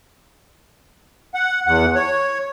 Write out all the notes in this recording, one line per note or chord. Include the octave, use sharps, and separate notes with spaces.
F#5
E2 F#5
C#5